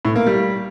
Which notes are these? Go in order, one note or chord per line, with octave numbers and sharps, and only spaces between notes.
A2
A#3
G3